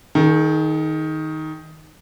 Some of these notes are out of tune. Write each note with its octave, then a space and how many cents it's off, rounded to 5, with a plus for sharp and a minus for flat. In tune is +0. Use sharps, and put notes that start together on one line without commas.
D#3 +10 G#4 +45